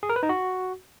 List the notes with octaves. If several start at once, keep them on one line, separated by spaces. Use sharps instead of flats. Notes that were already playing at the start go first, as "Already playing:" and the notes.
G#4
A#4
B4
D#4
F#4